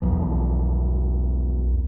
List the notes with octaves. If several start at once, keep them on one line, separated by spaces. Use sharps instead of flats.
B1 E2 F3